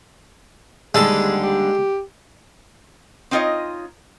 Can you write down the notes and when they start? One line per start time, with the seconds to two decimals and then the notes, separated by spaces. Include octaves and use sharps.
0.95 D#2 D3 G3 G#3 G#4 A4 A5
1.42 G4
3.31 C4 D#4 F4 C#5 D#5